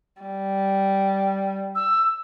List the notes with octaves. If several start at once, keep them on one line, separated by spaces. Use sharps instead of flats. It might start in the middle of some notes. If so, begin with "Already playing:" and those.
G3
E6